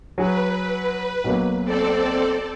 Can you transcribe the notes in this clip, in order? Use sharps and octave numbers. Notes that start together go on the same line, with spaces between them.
F#3 G#4 B4
B1 F#3 A#3
C4 A4 D5